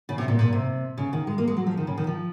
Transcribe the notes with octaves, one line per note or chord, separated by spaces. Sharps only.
C#3
C3
A#2
A#2
C3
C#3
D#3
G#3
A#3
G#3
F#3
F3
D#3
C#3
D#3
F3